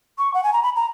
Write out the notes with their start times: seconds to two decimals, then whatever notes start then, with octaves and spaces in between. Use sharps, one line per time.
0.18 C#6
0.34 F#5
0.44 G#5
0.53 A#5
0.63 B5
0.76 A#5